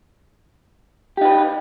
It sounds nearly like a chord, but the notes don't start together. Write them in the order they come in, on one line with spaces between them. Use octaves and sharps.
G4 D#4 B4